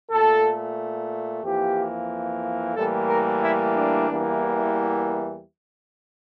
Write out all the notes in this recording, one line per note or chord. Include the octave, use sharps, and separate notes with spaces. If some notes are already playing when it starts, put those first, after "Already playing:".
A#2 A3 A4
F2 E3 A#3 G4
A2 E3 G3 A#3 A4
A#4
E4
D4
E2 E3 G3 A#3